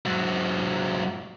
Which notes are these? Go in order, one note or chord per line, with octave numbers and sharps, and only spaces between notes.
G#2 F#3